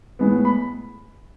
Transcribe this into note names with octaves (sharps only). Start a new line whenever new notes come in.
A2 G#3 B3
B5